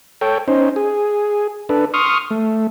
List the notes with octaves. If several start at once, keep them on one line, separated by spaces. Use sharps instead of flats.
A4 C#5 G5
C#4 D#4 C5
G#4
D4 A4 B4
C6 C#6 D#6 F6
A3